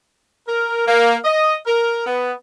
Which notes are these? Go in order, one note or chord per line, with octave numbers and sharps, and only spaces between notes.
A#4
A#3
D#5
A#4
B3